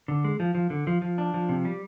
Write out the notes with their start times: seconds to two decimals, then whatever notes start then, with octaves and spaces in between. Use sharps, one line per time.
0.08 D3
0.24 G#3
0.40 F3
0.55 F3
0.70 D3
0.87 F3
1.02 F3
1.18 D4
1.34 F3
1.49 C3
1.65 G3